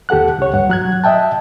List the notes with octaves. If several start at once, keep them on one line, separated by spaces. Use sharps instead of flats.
D#2 G4 A4 F#5 F#6
C#2 C#5
G2 F#5
F#3 F#6 G#6
D#5 E5 G5 A5